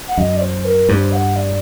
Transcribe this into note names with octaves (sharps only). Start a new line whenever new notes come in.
F#5
F#2 D#5
D5
C5
A#4
G2 C5
F#5
D5